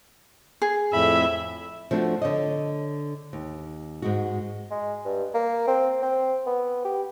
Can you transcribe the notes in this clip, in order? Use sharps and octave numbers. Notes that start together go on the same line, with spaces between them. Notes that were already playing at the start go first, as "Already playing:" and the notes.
G#4
F2 A2 E5 B5
F3 A3 D4 D#4 F#4
D3 C#5 D#5
D#2
G#2 G#3 F#4
G#3
G2
A#3
C4
C4
B3
G4